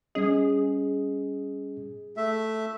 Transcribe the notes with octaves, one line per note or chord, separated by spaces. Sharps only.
G3 C#4 G#4 D#5
A3 E5